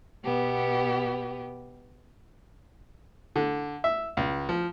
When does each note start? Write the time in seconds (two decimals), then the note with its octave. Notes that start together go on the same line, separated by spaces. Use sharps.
0.24 B2 B3 G4
3.36 D3
3.84 E5
4.17 C#2
4.49 F3